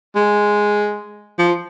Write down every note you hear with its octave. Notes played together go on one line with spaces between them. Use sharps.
G#3
F3